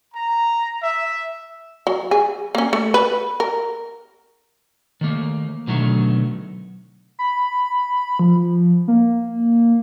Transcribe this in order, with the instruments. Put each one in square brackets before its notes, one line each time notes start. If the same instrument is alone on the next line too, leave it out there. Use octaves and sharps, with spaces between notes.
[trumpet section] A#5
E5
[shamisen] F#3
G#4
A#3 C#4
A3
B4
A#4
[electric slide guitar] D#3 A3 A#3
B2 D3 D#3 F#3 A3
[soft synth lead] B5
F3
A#3